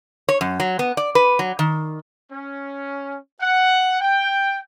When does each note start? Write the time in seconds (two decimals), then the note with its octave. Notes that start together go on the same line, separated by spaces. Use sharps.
0.29 C#5
0.41 F#2
0.60 F#3
0.79 B3
0.97 D5
1.15 B4
1.39 F#3
1.59 D#3
2.32 C#4
3.41 F#5
4.01 G5